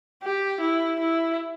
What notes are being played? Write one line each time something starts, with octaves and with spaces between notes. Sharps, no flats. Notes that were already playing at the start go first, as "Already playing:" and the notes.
G4
E4
E4